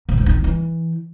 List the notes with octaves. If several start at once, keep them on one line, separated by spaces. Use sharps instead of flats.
A#2
G#2
D#3
C4
E3